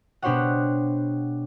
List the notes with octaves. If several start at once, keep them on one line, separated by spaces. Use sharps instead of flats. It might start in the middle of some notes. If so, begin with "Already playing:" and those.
B2 D4 G4 C5 C#5 F#5